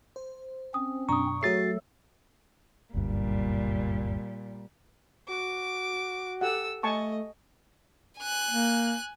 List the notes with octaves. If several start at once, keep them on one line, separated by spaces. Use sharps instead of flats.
C5
C4 C#4 D#6
F#2 B2 D4 A#5 C#6 D#6
F#3 A3 F#4 G#4 A4 C#5 A6 C7
F#1 D2 G2 A#2 G3
F#4 D6
G4 A4 F#5 E6
A3 D#5 G#5 A5 C#6
G#5 F#6
A#3